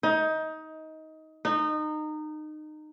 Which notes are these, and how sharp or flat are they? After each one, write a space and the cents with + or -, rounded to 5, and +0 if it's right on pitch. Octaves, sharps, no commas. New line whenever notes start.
D#4 +20
D#4 -25